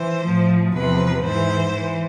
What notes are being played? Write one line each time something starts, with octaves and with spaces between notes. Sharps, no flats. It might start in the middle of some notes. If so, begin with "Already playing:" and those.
Already playing: E3 C5
A2 F3
E2 C3 F3 B4
G#2 E3 C5
E3